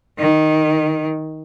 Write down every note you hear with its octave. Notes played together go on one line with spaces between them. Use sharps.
D#3